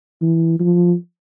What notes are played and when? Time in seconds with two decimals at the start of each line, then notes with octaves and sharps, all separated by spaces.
0.21 E3
0.60 F3